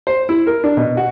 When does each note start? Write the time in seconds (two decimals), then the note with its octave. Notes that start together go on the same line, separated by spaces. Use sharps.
0.07 C5
0.29 E4
0.47 A#4
0.64 D4
0.77 B2
0.97 F#4